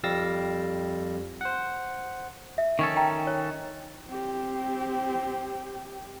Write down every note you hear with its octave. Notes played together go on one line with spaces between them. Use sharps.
F2 G3 F5 E6 A6 A#6
C5 F#5
E5
D#3 C#4 A4 C#6
G5 A5 A#5
C#5
C4 G4